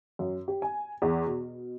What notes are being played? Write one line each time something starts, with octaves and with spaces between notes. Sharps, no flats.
F#2
G4
G#5
E2
B2